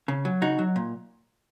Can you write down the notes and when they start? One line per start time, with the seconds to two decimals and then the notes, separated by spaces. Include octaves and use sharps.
0.08 C#3
0.25 F#3
0.42 C#3 D#4 F#4
0.59 F#3
0.76 A#2